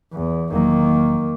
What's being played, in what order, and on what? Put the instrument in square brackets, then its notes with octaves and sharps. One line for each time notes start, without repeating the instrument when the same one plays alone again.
[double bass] E2
[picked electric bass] E1 F#3 [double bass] D#3 A#3